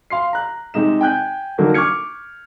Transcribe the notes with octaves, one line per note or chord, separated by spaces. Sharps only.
F5 C6 C7
A#5 F#6
C3 G#3 D#4 E7
G5 G#5 F#6 G6
D3 F#3 A#3 D#4 F#4
C#6 D6 F6 G#6 C#7